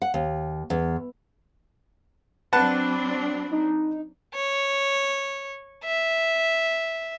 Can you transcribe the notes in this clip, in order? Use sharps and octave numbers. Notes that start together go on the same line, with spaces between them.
F#5
D#2
E2
F#3 C4 D4 B4 F#5 A5
D#4
C#5
E5